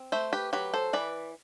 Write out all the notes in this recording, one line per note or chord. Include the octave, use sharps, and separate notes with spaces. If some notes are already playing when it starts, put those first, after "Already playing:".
Already playing: C4
A3 C5 E5
G4 B4
F#3 G4 B4
A4 C5
E3 B4 D5